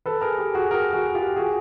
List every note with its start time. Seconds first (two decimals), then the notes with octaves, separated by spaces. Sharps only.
0.06 A4 B4
0.21 G#4 A#4
0.38 G4 A4
0.55 F#4 G#4
0.71 G#4 A#4
0.93 F#4 G#4
1.15 F4 G4
1.36 F#4 G#4